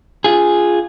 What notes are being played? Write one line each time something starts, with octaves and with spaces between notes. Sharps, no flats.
F4 G#4